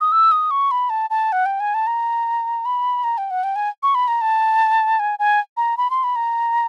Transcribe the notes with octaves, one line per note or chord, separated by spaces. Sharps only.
D#6
E6
D#6
C#6
B5
A5
A5
F#5
G5
G#5
A5
A#5
B5
A#5
G5
F#5
G5
G#5
C#6
B5
A#5
A5
G#5
G#5
A#5
B5
C6
B5
A#5